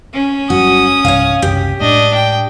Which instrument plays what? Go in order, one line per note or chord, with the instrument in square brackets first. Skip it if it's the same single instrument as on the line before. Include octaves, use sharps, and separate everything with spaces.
[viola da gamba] C#4
[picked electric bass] G1 F#3 G3 [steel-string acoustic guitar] F#4 [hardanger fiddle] D#6
[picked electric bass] B1 G2 C3 [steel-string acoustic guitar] C#5 F5
[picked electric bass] F#1 C2 [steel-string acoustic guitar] G4
[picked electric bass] A2 G#3 [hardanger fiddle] D4 D#5
[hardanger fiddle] G5